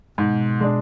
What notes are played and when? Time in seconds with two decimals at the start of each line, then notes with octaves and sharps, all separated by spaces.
0.18 G#2 B2
0.61 G#3 D4